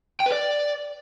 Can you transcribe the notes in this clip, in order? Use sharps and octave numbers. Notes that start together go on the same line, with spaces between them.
G5
B4
D5